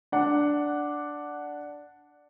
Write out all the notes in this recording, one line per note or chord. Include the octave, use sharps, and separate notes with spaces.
D4 F#5